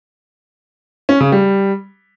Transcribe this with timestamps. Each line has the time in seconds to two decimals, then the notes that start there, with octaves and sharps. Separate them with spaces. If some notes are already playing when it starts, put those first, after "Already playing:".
1.09 C#4
1.20 C#3
1.32 G3